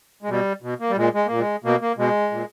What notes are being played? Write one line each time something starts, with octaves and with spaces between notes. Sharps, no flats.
G#3
B2 G3
B2
A#3
G3
A#2 G#3
G#3
A#2 A#3
G#3
B2 A#3
A#3
B2 G#3
A#2